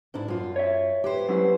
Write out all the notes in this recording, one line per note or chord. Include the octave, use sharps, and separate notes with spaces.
G#2 D4 E4
F#2 F4
C#5 E5
G4 B4 C5
F#3 C#4 E4